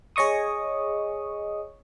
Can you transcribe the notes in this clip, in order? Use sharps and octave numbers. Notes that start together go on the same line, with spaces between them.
G#4 C#5 D#5 C#6 D#6